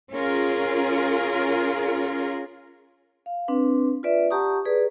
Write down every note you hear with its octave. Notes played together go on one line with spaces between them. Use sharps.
C#4 F4 G#4 A#4
F5
C4 D4 B4
F4 B4 D5 E5
G4 F#5 A5 A#5 C#6 D#6
G#4 B4 D5